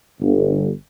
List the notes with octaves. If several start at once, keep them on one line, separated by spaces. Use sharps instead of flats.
G1